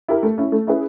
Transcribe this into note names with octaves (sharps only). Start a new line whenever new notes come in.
E4 G4 A#4
A3
C#4 E4
A3
C#4 E4 G#4 B4